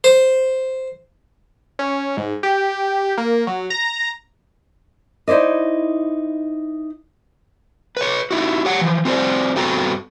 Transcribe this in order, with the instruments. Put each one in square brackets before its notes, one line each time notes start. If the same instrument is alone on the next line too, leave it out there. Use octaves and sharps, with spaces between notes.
[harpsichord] C5
[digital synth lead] C#4
G#2
G4
A#3
F#3
A#5
[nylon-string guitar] D#4 E4 C5 D5 D#5
[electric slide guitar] B4 C#5
D#4 E4 F#4
G4 C#5 F#5
E3 F3
C4 F4 F#4 A#4 C5 D5
G2 B3 C4 F#4 A4 A#5